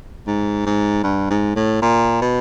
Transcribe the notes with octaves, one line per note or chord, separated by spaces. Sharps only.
G#2
G#2
G2
G#2
A2
A#2
B2